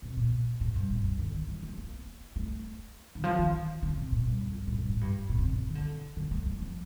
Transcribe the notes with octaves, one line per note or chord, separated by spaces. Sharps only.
C3
A#2
A2
G2
A2
G2
D3
D#3
F3
A3
A#3
A3
D#3
F3
D#3
D3
C3
A#2
G2
F2
G2
A2
G2
A2
G2
A#2
C3
D#3
D3
D#3
D3
D3
A3
A3
F3